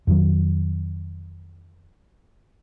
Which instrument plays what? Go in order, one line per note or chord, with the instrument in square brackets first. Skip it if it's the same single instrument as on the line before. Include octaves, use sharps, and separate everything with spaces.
[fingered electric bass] F2 D#3 F#3